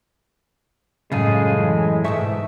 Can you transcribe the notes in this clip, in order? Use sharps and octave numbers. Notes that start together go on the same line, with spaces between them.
F#2 A2 C#3 G#3 F4 G#4
E3
G#2 B2 A3 E5 C#6